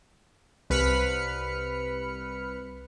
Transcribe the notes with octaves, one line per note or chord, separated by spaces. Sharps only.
C2 B4 B5 F6 C#7